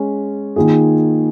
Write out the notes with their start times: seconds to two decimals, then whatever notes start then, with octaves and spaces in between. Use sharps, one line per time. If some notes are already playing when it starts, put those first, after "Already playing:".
Already playing: G#3 C#4
0.56 D#3 A#3 F4 G#4